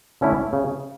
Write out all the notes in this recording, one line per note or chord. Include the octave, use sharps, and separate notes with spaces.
D3 A3 C#4 E4
C#3